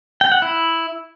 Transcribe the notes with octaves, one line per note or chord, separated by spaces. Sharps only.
G5
F#5
E4